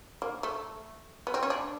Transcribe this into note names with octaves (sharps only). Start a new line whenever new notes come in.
A#3
A3
B3
C4
C#4
D4